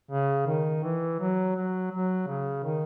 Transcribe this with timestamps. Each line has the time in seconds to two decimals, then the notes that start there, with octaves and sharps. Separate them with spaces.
0.11 C#3
0.47 D#3
0.84 E3
1.20 F#3
1.56 F#3
1.92 F#3
2.28 C#3
2.64 D#3